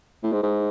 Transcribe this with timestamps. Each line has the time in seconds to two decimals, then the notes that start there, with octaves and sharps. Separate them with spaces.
0.23 A2
0.32 G#2
0.43 G#2